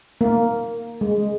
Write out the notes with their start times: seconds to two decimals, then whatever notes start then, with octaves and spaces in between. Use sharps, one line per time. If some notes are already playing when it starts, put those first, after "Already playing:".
0.21 A#3
1.01 G#3